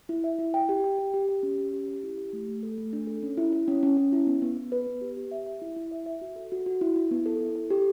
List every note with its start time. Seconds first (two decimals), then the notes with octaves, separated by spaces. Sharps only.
0.09 E4
0.24 E5
0.39 E4
0.54 G5
0.69 G4
0.84 G5
0.98 G4
1.14 G4
1.29 G4
1.43 C#4
1.58 C#4
1.73 G4
1.88 G4
2.03 E4
2.18 G4
2.33 A3
2.48 A3
2.63 A4
2.78 A3
2.93 D4
3.07 A4
3.23 C#4
3.37 E4
3.53 E4
3.68 C#4
3.83 C#4
3.97 C#4
4.12 E4
4.27 B3
4.42 B3
4.57 B3
4.72 B4
4.87 B3
5.01 G4
5.17 G4
5.31 E5
5.46 E5
5.62 E4
5.76 E4
5.91 E5
6.06 E5
6.21 F#4
6.36 A4
6.52 F#4
6.66 F#4
6.81 E4
6.96 E4
7.11 B3
7.26 A4
7.41 E4
7.56 A4
7.70 G4